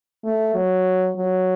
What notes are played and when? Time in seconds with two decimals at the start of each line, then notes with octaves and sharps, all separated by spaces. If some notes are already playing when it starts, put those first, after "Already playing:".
0.24 A3
0.54 F#3
1.16 F#3